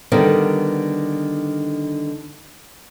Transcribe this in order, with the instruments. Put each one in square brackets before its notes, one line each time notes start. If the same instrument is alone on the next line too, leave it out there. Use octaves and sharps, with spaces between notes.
[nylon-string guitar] D3 D#3 G3 B3